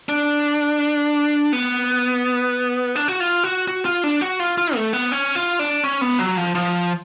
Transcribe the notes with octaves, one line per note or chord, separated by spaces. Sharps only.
D4
B3
D4
F#4
F4
F#4
F#4
F4
D4
F#4
F4
F4
A3
B3
C#4
F4
D4
C#4
B3
F#3
F3
F3